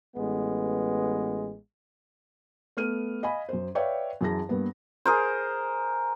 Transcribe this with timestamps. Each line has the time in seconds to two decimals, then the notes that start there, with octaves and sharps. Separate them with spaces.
0.15 A1 G#3 B3
2.77 A3 B3 F6 D#7
3.23 D#5 F5 G#5 B5
3.49 F#2 C5
3.75 B4 C#5 D5 E5 F5 G5
4.21 F#2 E3 E4 G#4 A5 A#6
4.49 G2 G3 A#3 B3
5.05 G#4 A#4 C5